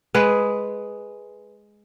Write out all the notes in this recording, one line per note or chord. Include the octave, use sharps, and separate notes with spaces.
G#3 G#4 B4